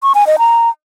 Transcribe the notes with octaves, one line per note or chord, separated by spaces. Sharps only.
C#6
G#5
D#5
A#5